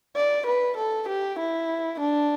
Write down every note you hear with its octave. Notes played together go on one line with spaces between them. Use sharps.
D5
B4
A4
G4
E4
D4